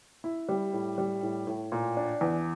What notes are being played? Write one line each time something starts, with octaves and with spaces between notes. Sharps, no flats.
E4
G3
A2
G3
A2
A2
A#2
D4
E2